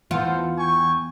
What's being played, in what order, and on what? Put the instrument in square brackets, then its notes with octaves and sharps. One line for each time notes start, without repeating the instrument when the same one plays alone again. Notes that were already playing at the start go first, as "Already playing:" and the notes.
[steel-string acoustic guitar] E2 C#3 F#5 [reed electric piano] E3 [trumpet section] C4 A4 C5 [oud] F4
[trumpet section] G5 G#5 C#6